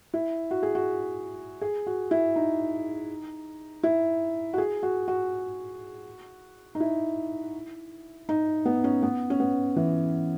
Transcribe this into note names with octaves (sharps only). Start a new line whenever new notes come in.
E4
F#4
G#4
F#4
G#4
F#4
E4
D#4
E4
F#4
G#4
F#4
F#4
D#4
E4
D#4
B3
C#4
B3
C#4
B3
E3